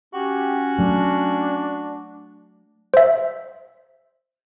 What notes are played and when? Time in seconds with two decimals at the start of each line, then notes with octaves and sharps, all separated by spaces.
0.14 C#4 F#4 G4
0.79 F#3 A3 D4
2.94 C5 E5